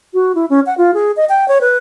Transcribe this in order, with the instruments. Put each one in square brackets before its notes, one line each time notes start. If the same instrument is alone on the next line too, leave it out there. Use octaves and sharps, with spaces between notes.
[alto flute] F#4
E4
C#4
F#5
F4
G#4
D#5
G5
C#5
B4